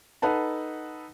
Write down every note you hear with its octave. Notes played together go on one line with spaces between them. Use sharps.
D#4 A4 B4 F#5 A5